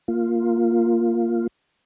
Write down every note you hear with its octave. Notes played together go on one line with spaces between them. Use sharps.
A#3 F4